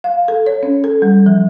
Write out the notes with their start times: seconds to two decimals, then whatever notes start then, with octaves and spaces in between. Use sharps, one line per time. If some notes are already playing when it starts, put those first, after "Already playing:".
0.04 F5
0.28 A4
0.47 C#5
0.63 C#4
0.84 A4
1.02 G3
1.26 F3